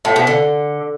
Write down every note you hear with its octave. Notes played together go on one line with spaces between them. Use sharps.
A2
B2
D3